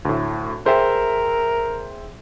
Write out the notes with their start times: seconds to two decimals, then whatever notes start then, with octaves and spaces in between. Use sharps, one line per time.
0.05 D2 A2
0.66 G#4 A#4 C5 E5 G5